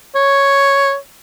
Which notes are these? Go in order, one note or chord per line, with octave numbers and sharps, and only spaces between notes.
C#5